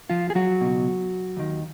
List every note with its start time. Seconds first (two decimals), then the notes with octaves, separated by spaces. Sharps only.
0.10 F3 F4
0.30 G#4
0.35 F#3 F#4
0.61 C#2 B2
1.37 D#2 D#3